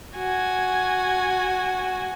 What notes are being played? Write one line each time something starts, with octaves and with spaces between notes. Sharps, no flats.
F#4 G#5